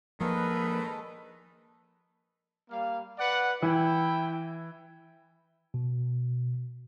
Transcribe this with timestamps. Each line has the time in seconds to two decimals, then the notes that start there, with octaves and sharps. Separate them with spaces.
0.21 D#3 F3 G#3 A#3 A4 B4
2.71 G3 A#3 F5
3.19 B4 D5 F#5
3.62 E3 E4 G5
5.74 B2